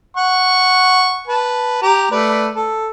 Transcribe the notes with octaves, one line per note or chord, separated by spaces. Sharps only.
F#5 C#6
B4 A5
G4 A#5
A3 B4 D5
A4